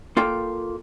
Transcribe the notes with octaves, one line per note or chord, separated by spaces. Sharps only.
A#3 F4 A4 G5